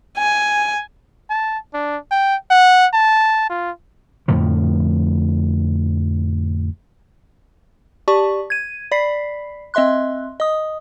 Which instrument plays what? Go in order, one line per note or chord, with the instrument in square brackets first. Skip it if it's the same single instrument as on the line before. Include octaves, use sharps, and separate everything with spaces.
[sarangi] G#5
[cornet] A5
D4
G5
F#5
A5
F4
[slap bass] F2 A2 D3 F3
[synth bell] G4 D5 A5 C#6
G#6 D#7
D5 B5 B6 C7
C4 D#5 E5 C6 F#6
D#5 D#6